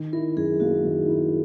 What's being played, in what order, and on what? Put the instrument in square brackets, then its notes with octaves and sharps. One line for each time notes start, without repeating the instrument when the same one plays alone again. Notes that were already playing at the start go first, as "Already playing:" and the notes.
Already playing: [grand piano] D#3
[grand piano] E4 [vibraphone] A#4
[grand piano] F#2 [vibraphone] G#4
[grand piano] A#3 [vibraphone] F#4
[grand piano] D#3
E4